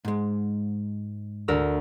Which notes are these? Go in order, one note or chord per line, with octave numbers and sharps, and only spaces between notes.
G#2 G#3
D2 A#4 E6